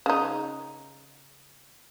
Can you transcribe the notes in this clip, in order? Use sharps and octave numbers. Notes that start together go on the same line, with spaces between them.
C#3 D#4